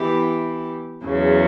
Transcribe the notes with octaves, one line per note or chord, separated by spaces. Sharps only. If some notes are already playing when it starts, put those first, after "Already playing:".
Already playing: E3 B3 E4 G4
E2 C#3 F#3